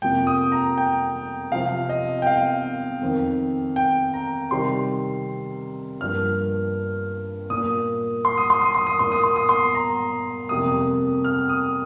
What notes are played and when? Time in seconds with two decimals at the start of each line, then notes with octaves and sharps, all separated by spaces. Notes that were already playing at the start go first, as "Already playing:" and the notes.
0.02 F2 C3 F3 A#3 G5
0.27 D#6
0.52 A#5
0.78 G5
1.52 C3 F3 C4 F5
1.89 D#5
2.22 G5
2.27 F5
3.01 F2 D#3 C4
3.76 G5
4.14 A#5
4.51 C3 D#3 G3 C4 C6
6.01 G2 F3 A#3 F6
7.50 A#2 A#3 D#6
8.25 C6
8.38 D#6
8.50 C6
8.62 D#6
8.75 C6
8.87 D#6
8.99 A#2 A#3 C6
9.12 D#6
9.23 C6
9.36 D#6
9.49 C6
9.75 A#5
10.49 F2 C3 G3 A#3 D#6
11.24 F6
11.49 D#6